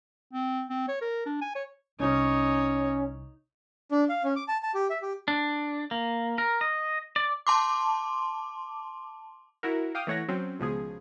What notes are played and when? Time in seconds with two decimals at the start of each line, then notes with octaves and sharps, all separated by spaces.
0.33 C4
0.69 C4
0.88 C#5
1.02 A#4
1.26 D4
1.41 G#5
1.55 C#5
2.00 C2 C#4 D#4 C#5
3.92 D4
4.09 F5
4.24 C#4
4.36 D6
4.48 A5
4.63 A5
4.75 G4
4.90 E5
5.02 G4
5.28 D4
5.91 A#3
6.38 A#4
6.61 D#5
7.16 D5
7.47 A5 C6 D6
9.63 E4 F#4 A#4
9.95 F5 G5 D6 D#6 F6
10.07 E3 A3 C#5 F#5 A#6
10.28 F#3 C4 C#4
10.59 C#2 B2 F3 G#4